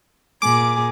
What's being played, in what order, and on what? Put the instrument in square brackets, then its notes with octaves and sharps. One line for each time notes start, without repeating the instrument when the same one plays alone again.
[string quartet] A#2 G#4 [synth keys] D6